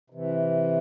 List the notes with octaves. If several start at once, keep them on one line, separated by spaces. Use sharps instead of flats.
C3 E3